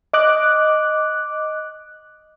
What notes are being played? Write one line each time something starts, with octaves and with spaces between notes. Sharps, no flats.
D#5 D6 F#6